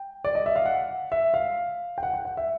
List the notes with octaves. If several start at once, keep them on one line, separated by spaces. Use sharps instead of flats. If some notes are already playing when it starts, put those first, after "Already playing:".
Already playing: G5
D5
D#5
E5
F5
F#5
E5
F5
G5
F#5
G5
F#5
E5